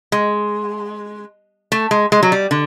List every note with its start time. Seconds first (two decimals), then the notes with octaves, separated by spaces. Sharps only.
0.12 G#3
1.72 A3
1.91 G#3
2.12 G#3
2.23 F#3
2.32 G3
2.51 D3